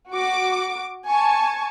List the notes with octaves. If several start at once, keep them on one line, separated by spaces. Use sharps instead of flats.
F#4 D6
G#5 A5 C#6